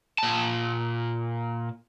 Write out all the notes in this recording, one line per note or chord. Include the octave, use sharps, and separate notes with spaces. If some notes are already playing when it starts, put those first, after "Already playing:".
A#2 A5